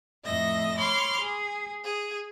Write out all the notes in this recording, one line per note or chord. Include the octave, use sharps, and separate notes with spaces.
F2 A2 D#5 E5 A#6
C#5 B5 C6 D6 F6
G#4
G#4